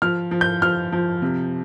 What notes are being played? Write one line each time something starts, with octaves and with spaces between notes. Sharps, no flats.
F3 F6
F3
G6
F3 F6
F3
C3